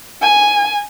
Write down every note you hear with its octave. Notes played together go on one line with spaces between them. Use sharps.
G#5